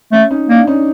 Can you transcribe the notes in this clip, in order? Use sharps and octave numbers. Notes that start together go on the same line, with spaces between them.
A3 C#4
C#4 D#4
A#3 D4
C#4 D#4